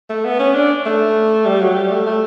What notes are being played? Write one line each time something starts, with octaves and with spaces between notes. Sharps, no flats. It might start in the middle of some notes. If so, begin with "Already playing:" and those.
A3
B3
C#4
D4
A3
G3
F#3
G3
A3
A3